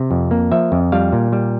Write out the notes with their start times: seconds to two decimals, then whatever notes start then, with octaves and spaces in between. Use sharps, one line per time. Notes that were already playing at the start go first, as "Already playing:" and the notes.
Already playing: C3
0.11 F2
0.31 A#3
0.51 F3 E5
0.72 F2
0.92 G3 F5
1.12 A#2
1.32 G3